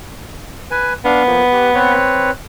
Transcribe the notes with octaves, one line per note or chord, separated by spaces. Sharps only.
B4 G#5
B3 D4 F5
F3 A#3
G4 B4
C4 B4 C#5